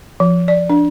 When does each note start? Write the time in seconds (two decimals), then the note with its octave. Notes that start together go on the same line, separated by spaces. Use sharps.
0.20 F3
0.48 D5
0.70 D4